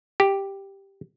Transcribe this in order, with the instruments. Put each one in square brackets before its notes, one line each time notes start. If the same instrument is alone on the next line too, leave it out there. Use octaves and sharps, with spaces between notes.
[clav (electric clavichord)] G4